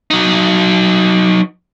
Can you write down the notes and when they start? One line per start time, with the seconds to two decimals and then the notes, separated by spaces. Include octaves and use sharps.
0.11 F#3 D#4